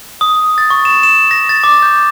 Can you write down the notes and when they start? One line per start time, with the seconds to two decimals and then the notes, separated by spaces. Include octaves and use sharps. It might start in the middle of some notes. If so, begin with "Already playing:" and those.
0.21 D#6
0.58 A6
0.70 C#6
0.85 E7
1.03 E7
1.31 A#6
1.49 A6
1.64 D6
1.83 G6